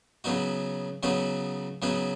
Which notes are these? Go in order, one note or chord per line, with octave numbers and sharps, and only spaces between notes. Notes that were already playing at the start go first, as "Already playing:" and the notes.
C#3 F#3 B3 D#4 F#4
C#3 F#3 B3 D#4 F#4
C#3 F#3 B3 D#4 F#4